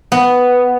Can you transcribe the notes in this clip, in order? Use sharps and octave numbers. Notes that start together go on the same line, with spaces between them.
B3